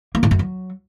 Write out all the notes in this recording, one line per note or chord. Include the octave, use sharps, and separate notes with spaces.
A#3
A2
F#2
F#3